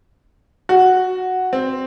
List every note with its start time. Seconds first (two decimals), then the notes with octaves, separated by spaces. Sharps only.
0.69 F#4
1.53 C4